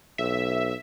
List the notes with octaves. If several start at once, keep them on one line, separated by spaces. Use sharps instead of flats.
B1 E5